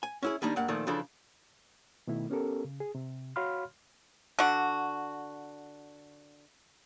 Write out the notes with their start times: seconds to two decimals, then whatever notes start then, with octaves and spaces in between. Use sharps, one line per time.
0.03 G#5
0.23 C#4 E4 G#4
0.42 D#3 G3 A#3 D4 D#4
0.56 G2 A#3 F#5
0.68 A#2 D#3 F3 A3
0.87 C#3 E3 F3 D4 A4
2.07 B2 D#3 A3 E4
2.30 B3 C#4 G4 A4 A#4
2.64 C#3
2.80 G#4
2.95 C3
3.36 F#4 C#5 F5 B5 C6 F6
4.39 D3 F#4